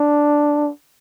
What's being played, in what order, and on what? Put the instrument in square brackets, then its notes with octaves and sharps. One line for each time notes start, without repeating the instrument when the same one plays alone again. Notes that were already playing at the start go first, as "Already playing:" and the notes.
Already playing: [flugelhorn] D4